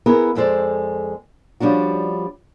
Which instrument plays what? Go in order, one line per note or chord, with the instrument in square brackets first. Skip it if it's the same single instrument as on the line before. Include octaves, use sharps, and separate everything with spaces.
[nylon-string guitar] B3 E4 G#4 A#4
F2 G#3 A4 C5 D5
F3 G3 C#4 D4 F#4